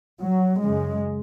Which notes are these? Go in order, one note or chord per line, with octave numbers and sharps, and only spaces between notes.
F#3
F#2 C#3 G#3